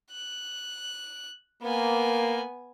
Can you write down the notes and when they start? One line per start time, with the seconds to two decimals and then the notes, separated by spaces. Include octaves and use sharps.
0.11 F#6
1.62 A#3 B3 G#5